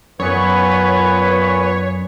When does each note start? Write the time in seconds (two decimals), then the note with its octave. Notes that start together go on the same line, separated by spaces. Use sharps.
0.20 F#2 A#2 B3 B4 C#5 G#5